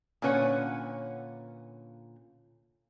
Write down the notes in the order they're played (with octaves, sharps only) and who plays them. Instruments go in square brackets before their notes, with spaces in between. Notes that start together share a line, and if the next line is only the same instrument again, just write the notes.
[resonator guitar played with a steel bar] A#2 D3 C#4 B4 C#5 F#5